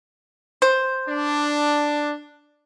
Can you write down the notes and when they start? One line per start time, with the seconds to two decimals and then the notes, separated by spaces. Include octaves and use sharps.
0.62 C5
1.07 D4